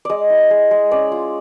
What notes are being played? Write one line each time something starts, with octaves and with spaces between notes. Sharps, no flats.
G#3 D5 D#5
E4
G#3
G#3
C#4 D5
F4